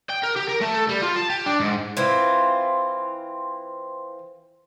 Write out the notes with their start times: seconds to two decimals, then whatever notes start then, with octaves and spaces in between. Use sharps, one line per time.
0.10 G5
0.24 A#4
0.37 G4
0.49 A#4
0.61 A3
0.75 A4
0.89 G3
1.02 F4
1.16 A5
1.30 G4
1.46 D4
1.60 G#2
1.97 E3 C4 F4